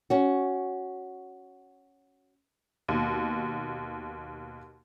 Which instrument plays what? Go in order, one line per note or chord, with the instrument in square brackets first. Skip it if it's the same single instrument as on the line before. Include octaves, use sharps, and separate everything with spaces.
[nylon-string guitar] C#4 F#4
[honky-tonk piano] D#2 B2